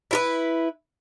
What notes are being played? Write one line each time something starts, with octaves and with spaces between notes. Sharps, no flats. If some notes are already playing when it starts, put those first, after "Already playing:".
E4 F4 B4